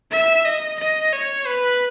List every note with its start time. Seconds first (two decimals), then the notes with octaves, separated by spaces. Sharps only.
0.12 E5
0.45 D#5
0.79 D#5
1.13 C#5
1.47 B4